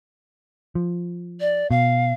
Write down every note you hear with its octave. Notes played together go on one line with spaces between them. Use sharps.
F3
D5
B2 F5